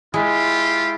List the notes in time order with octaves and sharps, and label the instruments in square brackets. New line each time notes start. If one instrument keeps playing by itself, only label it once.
[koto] G#3 [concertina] E4 [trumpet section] F4 G4